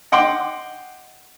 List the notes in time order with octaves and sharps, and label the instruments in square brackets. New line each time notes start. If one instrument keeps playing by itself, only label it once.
[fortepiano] D#5 F#5 G5 C6 D6